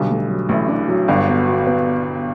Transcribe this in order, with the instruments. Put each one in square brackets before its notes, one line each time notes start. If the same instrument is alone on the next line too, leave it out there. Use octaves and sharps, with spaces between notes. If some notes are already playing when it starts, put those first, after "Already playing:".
Already playing: [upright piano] B1 B2 [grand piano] D3 G3
[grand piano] A3
F#3
[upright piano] A1 A2 [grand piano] A3
[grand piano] D4
F#3
[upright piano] G1 G2 [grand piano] F#4
[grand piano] B3
F#4
B3